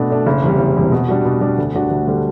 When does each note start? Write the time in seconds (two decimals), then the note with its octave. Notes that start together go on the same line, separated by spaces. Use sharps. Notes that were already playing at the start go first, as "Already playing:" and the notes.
Already playing: B2 A3 D4
0.10 A3 D4
0.27 F#1
0.42 E2 C3 G3
0.59 F#1
0.76 E2 C3 G3
0.92 B2
1.08 G3 D4 F#4
1.25 B2
1.41 G3 D4 F#4
1.58 D2
1.74 D3 G3 D4 F#4
1.91 D2
2.07 D3 G3 D4 F#4